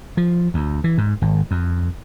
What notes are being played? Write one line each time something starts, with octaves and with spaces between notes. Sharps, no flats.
F3
D2
E3
G#2
G#1
F2